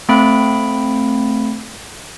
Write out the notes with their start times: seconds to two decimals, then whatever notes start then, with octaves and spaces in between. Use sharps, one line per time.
0.09 A3 C4 F5 B5 D7